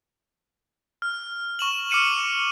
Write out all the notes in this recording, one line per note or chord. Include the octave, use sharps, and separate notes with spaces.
F6
C#6 E7 F#7
D6 F6 C#7 D#7 E7